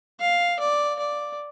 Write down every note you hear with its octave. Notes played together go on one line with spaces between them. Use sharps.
F5
D5
D5